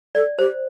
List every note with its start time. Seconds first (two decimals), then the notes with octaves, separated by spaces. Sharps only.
0.15 A4 D5
0.39 G4 C5